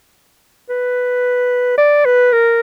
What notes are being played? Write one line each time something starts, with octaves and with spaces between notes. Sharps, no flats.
B4
D5
B4
A#4